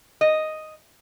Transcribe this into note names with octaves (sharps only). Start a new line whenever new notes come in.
D#5